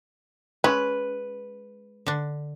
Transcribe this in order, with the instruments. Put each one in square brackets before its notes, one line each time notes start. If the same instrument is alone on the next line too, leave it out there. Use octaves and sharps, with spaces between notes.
[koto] G#3 C#4 [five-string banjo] B4
[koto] D3 D4